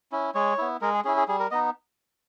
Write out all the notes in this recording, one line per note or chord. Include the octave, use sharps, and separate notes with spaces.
C#4 E4
G#3 C#5
B3 E4
G#3 A#4
G#4
C#4 E4 G#4
G#4
G3 G#4
A#4
B3 D#4 D#5